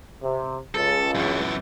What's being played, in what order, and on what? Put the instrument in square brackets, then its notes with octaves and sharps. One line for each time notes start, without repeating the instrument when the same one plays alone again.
[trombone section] C3
[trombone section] C#2 [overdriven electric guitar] A4
[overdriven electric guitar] F#2 E3